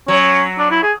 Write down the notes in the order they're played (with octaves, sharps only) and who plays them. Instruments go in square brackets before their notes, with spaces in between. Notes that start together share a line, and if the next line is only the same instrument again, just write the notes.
[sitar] F#3 [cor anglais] C#4
[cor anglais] D4
E4
G#4